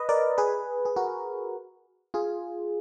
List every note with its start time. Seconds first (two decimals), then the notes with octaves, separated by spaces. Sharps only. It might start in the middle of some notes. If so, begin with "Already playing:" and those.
Already playing: B4 D#5
0.09 A#4 D5
0.38 G#4 B4
0.85 G#4
0.96 F#4 A#4
2.14 F4 G#4